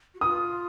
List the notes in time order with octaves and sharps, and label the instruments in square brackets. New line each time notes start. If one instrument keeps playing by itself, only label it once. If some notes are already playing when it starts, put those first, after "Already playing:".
[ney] F#4
[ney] F4 [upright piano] D#6